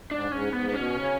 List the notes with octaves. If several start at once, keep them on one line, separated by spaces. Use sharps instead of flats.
G#2 D4
G#2 C#4
G#2 B3
B3
B2 C#4
C#3